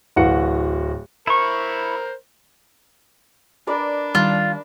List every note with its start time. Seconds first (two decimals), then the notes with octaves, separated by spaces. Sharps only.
0.16 D1 E3 F#4 F5 F#5 C#7
1.27 E4 A#4 C5 C#6
3.67 D4 A#4 D5 B5
4.15 D#3 G3 F4